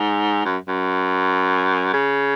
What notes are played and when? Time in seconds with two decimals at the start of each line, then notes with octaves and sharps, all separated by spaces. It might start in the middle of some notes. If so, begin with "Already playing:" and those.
Already playing: G#2
0.45 F#2
0.68 F#2
1.93 C#3